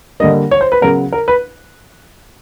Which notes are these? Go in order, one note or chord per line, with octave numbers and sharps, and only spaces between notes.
D3 G3 A#3 D#5
C#5
C5
B4
C#3 F#3 B3 A#4
A#4
B4